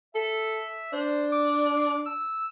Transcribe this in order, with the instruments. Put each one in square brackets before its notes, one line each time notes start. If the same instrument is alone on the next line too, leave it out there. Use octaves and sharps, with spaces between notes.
[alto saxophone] A4 [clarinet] E5
[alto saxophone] D4 [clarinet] C5
[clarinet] D6
E6